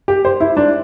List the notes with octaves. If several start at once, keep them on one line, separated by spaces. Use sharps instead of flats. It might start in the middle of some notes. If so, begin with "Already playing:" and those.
G4
C5
E4
D4